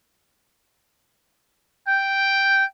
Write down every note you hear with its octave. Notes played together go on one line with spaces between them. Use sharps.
G5